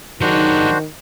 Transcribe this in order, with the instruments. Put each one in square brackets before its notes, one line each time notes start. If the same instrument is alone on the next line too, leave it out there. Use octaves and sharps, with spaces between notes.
[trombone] D#3 [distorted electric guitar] F#3 G#3 [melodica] D4 F#4 C5 [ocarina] D#4